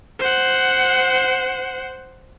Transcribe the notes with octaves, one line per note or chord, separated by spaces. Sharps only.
C5 F#5